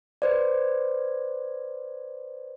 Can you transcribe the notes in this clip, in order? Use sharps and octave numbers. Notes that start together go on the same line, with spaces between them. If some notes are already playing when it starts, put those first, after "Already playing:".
B4 C5 D5